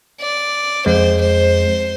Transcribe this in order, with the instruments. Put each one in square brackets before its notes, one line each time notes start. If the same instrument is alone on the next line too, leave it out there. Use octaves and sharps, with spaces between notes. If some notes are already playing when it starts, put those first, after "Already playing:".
[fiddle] D5
[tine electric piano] F2 G#3 [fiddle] C5
[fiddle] C5